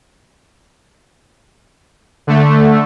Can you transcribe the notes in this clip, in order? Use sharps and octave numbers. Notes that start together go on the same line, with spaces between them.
D3 A3